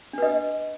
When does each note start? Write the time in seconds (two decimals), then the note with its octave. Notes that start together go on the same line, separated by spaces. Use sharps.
0.13 D4
0.18 B4
0.22 D#5